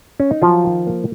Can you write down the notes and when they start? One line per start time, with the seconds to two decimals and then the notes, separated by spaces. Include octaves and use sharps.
0.20 C#4
0.31 D#4
0.42 F3 F#3 F4
0.64 D#3
0.87 A#3